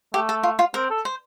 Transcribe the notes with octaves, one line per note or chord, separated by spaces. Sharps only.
A3 G4
A4
F4
F4
C4 A#4
A4
C5